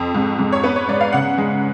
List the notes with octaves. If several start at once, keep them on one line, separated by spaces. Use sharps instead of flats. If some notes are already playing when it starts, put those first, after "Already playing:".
Already playing: F2
G#2
G#2
C#5
B3 B4
C#5
G#2 D5
F5
C#3 F#5
G#3